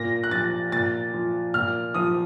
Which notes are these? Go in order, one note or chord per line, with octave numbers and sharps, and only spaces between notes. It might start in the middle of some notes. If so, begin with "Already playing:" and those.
Already playing: A#2 A#6
F#6
F3 A6
A#2 A6
F3
A#2 F6
F3 D#6